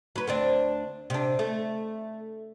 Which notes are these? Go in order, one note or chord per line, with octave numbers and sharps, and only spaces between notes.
F#3 B4
D2 C4 D4
C3 D4
A3